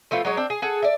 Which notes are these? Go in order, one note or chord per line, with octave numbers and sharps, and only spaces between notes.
F3 A3 B3 F4
F#3 G#3 C#5
C4 D4
G#4
G#4 A4 F#5
D5 E5